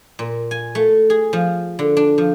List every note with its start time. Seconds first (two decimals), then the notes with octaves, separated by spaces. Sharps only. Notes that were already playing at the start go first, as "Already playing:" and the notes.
0.19 A#2
0.51 G#5
0.75 A3
1.10 G#4
1.33 F3
1.79 D3
1.97 D4
2.18 F3